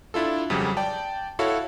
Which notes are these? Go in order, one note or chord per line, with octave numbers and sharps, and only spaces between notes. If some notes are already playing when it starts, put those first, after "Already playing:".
D4 E4 F4 A4
F2 C#3 F#3 G3
D5 G5 A5
E4 F#4 A4 C#5 F5